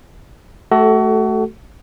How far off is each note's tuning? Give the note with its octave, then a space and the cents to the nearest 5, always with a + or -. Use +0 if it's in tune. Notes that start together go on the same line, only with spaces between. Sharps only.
A3 -15 F#4 +30 A4 +0